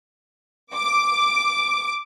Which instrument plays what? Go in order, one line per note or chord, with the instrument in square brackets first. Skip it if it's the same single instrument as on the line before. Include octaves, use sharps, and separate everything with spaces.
[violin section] D6